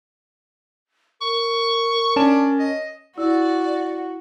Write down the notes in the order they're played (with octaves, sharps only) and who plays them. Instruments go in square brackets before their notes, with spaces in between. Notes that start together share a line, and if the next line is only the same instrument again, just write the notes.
[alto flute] A#4 [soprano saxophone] C#6
[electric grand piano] C#4 A5 E7 [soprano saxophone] D4
[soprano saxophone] D#5
[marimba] E4 [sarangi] F#4 [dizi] D5